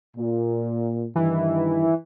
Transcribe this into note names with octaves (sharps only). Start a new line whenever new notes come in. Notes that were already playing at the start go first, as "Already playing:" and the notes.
A#2
G2 D#3 E3